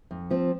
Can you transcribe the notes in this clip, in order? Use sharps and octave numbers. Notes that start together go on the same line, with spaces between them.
F2
F3 C4